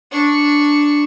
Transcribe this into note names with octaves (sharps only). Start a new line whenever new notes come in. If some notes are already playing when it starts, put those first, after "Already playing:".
D4 C#6